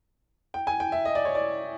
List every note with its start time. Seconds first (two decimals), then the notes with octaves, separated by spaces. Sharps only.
0.54 G5
0.67 G#5
0.80 G5
0.92 E5
1.05 D#5
1.15 D5
1.25 C#5
1.35 D5